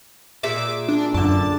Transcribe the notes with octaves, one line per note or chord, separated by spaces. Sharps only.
A#2 G#4 E5 D6
D4
F#2 D3 A5 D6